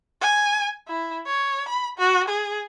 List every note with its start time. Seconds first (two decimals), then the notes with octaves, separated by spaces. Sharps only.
0.21 G#5
0.88 E4
1.26 C#5
1.68 B5
1.98 F#4
2.28 G#4